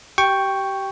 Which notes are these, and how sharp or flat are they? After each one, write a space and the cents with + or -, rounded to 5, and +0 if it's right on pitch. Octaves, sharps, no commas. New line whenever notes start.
G4 -25 G5 +0 C#6 +0